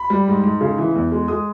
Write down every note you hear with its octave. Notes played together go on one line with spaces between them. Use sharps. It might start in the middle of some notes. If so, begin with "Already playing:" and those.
Already playing: B5
G3
G#2
G#2
C#3
E3
E2
G#3
G#3 D#6